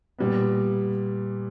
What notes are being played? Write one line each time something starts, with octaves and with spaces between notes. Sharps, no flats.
A#2 G3 B3